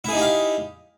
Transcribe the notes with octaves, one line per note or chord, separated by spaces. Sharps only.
D#4 E4 G4 G#4 F5